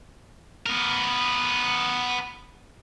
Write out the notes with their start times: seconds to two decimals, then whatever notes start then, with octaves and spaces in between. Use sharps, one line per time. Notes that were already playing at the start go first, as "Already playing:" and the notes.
0.66 B3 A#4